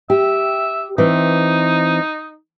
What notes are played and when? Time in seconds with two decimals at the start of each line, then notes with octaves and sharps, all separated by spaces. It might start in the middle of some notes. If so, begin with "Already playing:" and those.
0.10 G4 E5
0.98 E3 C4 D#4